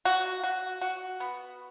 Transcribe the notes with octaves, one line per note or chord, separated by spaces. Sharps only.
F#4
F#4
F#4
B3